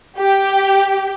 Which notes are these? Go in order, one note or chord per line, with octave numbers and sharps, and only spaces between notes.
G4